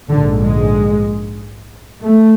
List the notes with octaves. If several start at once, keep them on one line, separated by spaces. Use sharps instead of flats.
A#1 G#2 D3
G#3
A3